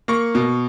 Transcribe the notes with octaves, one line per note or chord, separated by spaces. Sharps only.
A#3 C#6
B2